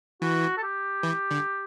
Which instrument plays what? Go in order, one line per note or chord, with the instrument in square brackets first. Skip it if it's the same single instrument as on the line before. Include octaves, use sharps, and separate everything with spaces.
[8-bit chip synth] E3 [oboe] F#4
[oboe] A4
G4
[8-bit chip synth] E3
D3